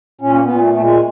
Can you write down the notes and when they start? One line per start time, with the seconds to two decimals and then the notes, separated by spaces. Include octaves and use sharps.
0.21 A#2 C#4
0.33 A#3
0.42 B3
0.49 A#2
0.61 A3
0.73 A#2 A3
0.82 G#3